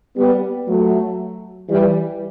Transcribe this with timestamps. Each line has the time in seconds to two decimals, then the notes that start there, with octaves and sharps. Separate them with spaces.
0.17 G3 B3
0.68 F#3 A3
1.69 E3 G3